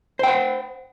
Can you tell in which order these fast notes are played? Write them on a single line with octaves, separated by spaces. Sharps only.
C5 G5 F#5